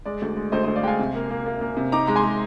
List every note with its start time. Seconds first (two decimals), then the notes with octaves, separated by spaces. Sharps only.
0.05 G#3 D5
0.22 D2
0.37 G#3
0.52 D2 C5 D#5
0.64 D2 C5 D#5
0.76 D5 F5
0.83 G#3 G5
0.87 F5 G#5
0.99 C3
1.15 A#3
1.31 A#3
1.46 A#3
1.61 A#3
1.77 C3
1.92 D#4 A#5 D6
2.07 G#3 A#5
2.16 G#5 C6
2.23 G#3